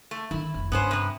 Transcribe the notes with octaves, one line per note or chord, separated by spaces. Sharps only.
A3
D3 D#3 E4
F1 D#3
G2 B3 C#4 C5
C3 B3